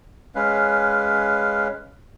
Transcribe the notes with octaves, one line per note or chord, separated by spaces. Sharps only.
G#3 C#4 B4 F5